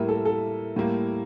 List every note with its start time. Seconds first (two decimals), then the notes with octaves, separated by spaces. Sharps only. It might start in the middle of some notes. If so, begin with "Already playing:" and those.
Already playing: A2 G3 A#3 A#4 E5
0.09 A4
0.25 A4
0.76 A2 G3 A#3